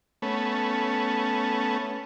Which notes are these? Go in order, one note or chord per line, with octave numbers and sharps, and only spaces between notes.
A3 B3 C#4